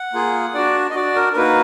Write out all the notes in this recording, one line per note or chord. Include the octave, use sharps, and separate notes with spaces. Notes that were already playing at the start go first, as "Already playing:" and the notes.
Already playing: F#5
A#3 F4 G#4
D4 F#4 D5
D#5
D4 F#4 D5
A#4
A#4
A#3 D#4 F#4 B4